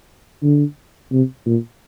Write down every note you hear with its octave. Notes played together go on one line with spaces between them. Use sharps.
D3
C3
A#2